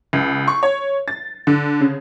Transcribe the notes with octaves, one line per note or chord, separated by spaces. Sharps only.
C#2
C#6
C#5
A6
D3
C#3